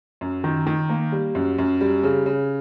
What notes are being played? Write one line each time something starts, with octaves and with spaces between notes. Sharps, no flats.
F#2
D#3
D#3
A#3
G3
F#2
F#2
G3
C#3
C#3